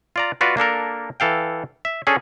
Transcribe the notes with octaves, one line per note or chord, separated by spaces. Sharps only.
F4 D5 A#5
A3 F4 F#4 B4 D5
A#3 D4 A4 A#4
E3 A4 F5 G5
E5
C#4 D4 G#4 A4